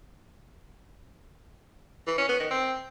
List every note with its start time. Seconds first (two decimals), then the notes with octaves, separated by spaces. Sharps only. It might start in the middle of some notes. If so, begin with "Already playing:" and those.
2.07 E3
2.18 C#4
2.29 B3
2.40 D#3
2.50 C4